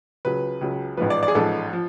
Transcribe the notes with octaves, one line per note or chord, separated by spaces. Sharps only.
C#2 C#3 F#3 B4
C#2 C#3 F#3
A1 G#2 F3 B4
D5
D5
G#4
A1 G#2 F3 A4
F3